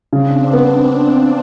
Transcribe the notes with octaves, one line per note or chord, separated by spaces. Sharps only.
C#3 C4 D4
B3 C4 D4